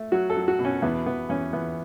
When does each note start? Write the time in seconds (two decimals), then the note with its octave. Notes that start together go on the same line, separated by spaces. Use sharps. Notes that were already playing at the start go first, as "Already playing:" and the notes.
Already playing: A3
0.12 F#3 F#4
0.30 A4
0.36 F#3
0.48 F#4
0.59 B2
0.65 C#4
0.82 E2 B3
1.06 E2 B3
1.29 E2 C#4
1.53 E2 B3